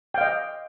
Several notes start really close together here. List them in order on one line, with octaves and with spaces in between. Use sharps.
G5 F5 D#5